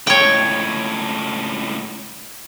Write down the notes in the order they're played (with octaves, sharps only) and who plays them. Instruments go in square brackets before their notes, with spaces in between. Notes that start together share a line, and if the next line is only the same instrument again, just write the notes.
[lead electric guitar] C#2 A2 [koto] C#5 G5